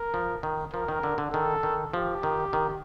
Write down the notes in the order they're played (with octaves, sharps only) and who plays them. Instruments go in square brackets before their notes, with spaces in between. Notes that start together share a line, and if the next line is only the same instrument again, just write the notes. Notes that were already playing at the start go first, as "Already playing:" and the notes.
Already playing: [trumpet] A#4
[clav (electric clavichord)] F3
D#3
[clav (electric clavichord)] F3 [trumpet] A#4
[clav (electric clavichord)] D#3
D3
D3
[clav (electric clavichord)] D#3 [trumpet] A4
[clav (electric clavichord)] D#3
[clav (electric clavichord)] F3 [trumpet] G4
[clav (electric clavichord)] D#3
D#3